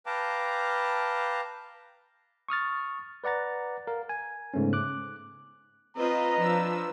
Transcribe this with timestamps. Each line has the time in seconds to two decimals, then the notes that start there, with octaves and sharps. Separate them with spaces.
0.06 B4 F5 G5 A5 A#5 D6
2.49 C#6 D#6 F6 A6
3.24 B4 D5 F#5 A#5 A6
3.87 A#4 F5
4.09 G#5
4.54 G#2 C#3 A3 B3 C#4
4.73 D6 F#6
5.97 C4 F4 B4 D#5 A#5
6.37 F3 D4 E6